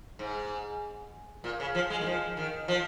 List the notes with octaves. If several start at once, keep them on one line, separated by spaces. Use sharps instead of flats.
G#2
A#2
C#3
F3
G#3
D#3
F3
D#3
F3